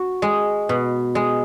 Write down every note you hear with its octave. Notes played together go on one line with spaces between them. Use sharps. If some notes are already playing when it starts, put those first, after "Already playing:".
Already playing: F#4
G#3
B2
G#3